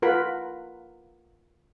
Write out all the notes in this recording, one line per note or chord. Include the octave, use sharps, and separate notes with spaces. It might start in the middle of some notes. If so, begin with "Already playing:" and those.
F4 A#4 B4 F#5 B5